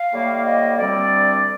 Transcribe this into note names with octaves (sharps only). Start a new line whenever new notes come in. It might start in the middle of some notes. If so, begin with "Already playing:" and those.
Already playing: F5
A2 G3 A#3
D#5
D2 D3 G3 C4 D5